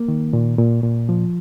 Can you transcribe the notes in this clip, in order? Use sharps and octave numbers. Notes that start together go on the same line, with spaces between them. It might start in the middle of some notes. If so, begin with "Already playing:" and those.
Already playing: A#3
D#3
A#2
A#2
A#2
F3